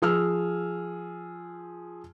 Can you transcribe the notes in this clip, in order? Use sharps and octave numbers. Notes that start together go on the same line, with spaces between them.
F3 G#4 E6 F6